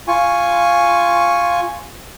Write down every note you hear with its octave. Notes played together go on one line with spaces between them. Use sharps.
F4 G#5 C#6